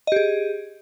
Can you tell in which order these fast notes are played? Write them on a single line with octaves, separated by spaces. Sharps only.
D#5 G4 G#4